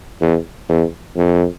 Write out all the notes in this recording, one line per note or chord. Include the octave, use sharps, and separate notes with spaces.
E2
E2
F2